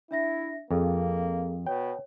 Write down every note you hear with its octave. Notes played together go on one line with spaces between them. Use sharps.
D4 E4 E5 A#6
F2 A#3 G#4 A4
B2 C#5 G5